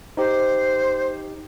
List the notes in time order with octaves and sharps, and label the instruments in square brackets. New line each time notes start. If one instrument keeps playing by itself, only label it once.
[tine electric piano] D#4 G4 [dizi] C5